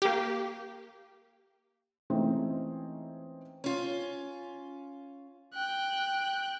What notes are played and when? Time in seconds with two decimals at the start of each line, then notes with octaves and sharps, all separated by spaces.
0.02 A#3 G4
2.10 E3 G#3 A3 C4 C#4 D#4
3.64 C#4 F4
5.54 G5 F#6